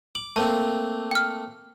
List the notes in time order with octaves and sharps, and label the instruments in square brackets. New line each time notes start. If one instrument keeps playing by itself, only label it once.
[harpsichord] D6 [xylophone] F#7
[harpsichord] A3 A#3 C4 [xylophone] A5
[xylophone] G5 F6